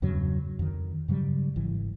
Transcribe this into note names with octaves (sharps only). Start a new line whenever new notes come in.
E2 G2 C#3 F#3
F2 D#3
G2 C#3 F#3 G3
G#1 E3